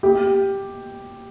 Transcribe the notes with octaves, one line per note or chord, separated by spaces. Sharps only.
G4